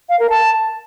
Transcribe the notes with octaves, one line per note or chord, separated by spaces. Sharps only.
F5
A#4
A5